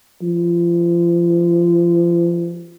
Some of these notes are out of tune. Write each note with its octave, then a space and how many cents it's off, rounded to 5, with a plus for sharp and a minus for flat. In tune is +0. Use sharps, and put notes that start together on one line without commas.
F3 -30